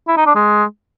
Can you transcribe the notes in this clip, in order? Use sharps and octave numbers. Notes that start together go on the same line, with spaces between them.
E4
D#4
D4
G#3